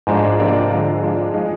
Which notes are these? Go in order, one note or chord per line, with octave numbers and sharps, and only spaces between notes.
G#2 F3 G#3 D4 F4
C3 F3 A#3 D4 F4
D3 F3 G#3
F3 G#3 D4 F4
F3 G#3 D#4